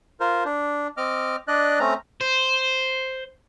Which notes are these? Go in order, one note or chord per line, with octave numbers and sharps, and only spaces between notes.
F4 A#4 C5
D4
C4 D#5 D6 F6
D4 D5 D#5 F#6
A3 C4 C#4 A#5
C5